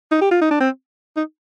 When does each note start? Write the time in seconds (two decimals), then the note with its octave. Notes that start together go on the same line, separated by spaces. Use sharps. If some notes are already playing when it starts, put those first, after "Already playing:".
0.12 D#4
0.21 G4
0.31 F4
0.42 D#4
0.51 D4
0.61 C4
1.17 D#4